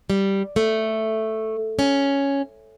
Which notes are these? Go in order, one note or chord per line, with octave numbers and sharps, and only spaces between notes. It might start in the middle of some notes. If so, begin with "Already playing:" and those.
G3
A3
C#4